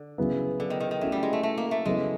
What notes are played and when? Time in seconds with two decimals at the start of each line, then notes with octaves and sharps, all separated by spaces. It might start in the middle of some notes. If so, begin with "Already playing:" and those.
Already playing: D3
0.18 C#3 F#3 B3 E4
0.60 D3
0.70 D#3
0.80 D#3
0.91 D#3
1.01 E3 A3 C#4 F#4
1.12 G3
1.23 G#3
1.33 A3
1.43 A3
1.58 A#3
1.71 A3
1.85 C#3 F#3 G#3 B3 E4 A4